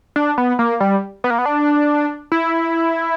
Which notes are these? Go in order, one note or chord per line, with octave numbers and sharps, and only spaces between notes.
D4
B3
A#3
G3
B3
A#3
B3
D4
E4